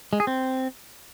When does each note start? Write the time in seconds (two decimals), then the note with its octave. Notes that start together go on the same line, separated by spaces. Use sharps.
0.13 G#3
0.20 G#4
0.27 C4